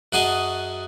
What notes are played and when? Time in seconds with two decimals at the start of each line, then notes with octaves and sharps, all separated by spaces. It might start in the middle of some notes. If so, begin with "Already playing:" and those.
0.13 F#2 F#4 G#4 D#5 A5